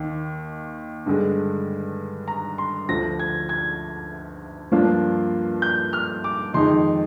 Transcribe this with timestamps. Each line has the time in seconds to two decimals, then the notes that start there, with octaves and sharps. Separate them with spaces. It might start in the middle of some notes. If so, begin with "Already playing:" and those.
Already playing: D#2 D#3
1.06 G2 D3 G#3
2.28 A#5
2.58 C6
2.89 D2 D3 F3 A#6
3.19 G#6
3.49 G#6
4.71 G2 F3 A#3 D4 F4
5.62 G6
5.93 F6
6.24 D6
6.54 F2 D#3 G#3 D#4 C6